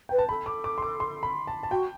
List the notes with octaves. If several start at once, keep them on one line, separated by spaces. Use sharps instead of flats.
B4 G5
A5
A4 B5
D6
D6
C6
D6
C6
B5
A5
A5
F#4 G5